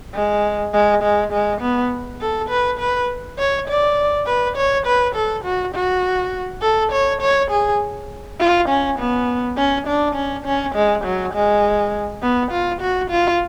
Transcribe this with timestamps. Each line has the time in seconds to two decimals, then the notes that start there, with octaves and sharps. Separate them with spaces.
0.14 G#3
0.73 G#3
1.03 G#3
1.32 G#3
1.61 B3
2.21 A4
2.49 B4
2.79 B4
3.38 C#5
3.68 D5
4.27 B4
4.57 C#5
4.86 B4
5.15 A4
5.44 F#4
5.75 F#4
6.62 A4
6.92 C#5
7.22 C#5
7.51 G#4
8.40 F4
8.69 C#4
8.99 B3
9.57 C#4
9.87 D4
10.15 C#4
10.45 C#4
10.75 G#3
11.05 F#3
11.34 G#3
12.22 B3
12.51 F4
12.81 F#4
13.10 F4